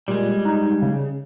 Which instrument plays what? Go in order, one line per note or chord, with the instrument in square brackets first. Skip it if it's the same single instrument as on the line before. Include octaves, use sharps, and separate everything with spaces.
[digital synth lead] A#2 [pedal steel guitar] G3 G#3
[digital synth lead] D#4
C#3